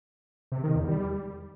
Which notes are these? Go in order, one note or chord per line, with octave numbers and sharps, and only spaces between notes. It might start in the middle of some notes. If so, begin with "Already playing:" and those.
C3
D#3
E2
G3